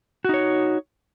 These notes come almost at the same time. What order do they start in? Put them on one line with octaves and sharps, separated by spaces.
F#4 D#4 C#5